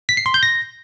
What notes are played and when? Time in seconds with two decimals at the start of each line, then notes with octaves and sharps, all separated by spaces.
0.09 B6
0.17 C7
0.26 C6
0.34 G6
0.43 A#6